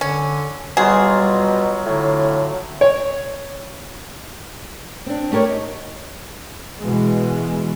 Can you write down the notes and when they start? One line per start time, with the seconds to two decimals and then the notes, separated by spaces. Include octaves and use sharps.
0.01 D3 C#4
0.77 B2 F#3 G3 F4 G#4 C6
1.85 A2 D3
2.81 C#5
5.06 C4 D4
5.32 A3 G4 A#4 C#5
5.49 D#4
6.80 B2 E3 G#3